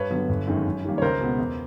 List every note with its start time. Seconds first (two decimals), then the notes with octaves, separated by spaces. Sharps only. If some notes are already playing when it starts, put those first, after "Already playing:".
Already playing: G2 B4 C#5
0.11 D3 F#3 B3
0.29 G1
0.47 F#2 D#3 G#3
0.66 F#2
0.84 D#3 G3 A#3
0.98 C#5
1.02 C#2 A#4 C5
1.20 B2 G#3 B3
1.38 E2